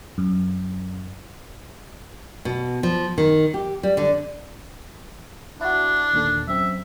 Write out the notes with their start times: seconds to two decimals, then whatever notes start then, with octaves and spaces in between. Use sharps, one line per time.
0.18 F#2
2.45 B2
2.83 F3
3.18 D#3
3.54 G4
3.83 G3
3.97 D3
5.61 D4 E4 F#4
6.13 D#2 A#2 D3
6.48 F#2 C4 E5